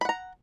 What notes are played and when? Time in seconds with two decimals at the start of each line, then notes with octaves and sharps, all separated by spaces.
0.01 B5
0.05 F#5
0.09 A#5